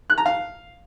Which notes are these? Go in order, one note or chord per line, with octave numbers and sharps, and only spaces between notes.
F#6
A#5
F5